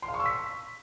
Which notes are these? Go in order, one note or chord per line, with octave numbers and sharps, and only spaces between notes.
C6
F5
C#6
E6
B6